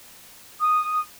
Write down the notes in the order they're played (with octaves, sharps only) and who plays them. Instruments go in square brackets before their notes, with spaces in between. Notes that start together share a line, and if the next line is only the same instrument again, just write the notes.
[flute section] D#6